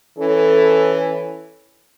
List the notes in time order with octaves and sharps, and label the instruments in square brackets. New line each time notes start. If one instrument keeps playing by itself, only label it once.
[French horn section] E3 C#4 A4